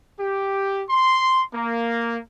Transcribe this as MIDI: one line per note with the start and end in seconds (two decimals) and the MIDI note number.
0.18 0.83 67
0.89 1.42 84
1.53 2.17 58